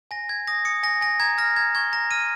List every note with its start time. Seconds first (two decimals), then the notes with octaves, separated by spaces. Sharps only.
0.11 G#5 A#6
0.29 G#5 G#6
0.47 D#6 A#6
0.65 D#6 C#7
0.83 G#5 A#6
1.01 G#5 A#6
1.20 A#5 G#6
1.38 F6 A#6
1.56 A#5 G#6
1.75 C#6 G#6
1.92 A#5 A#6
2.11 F6 D#7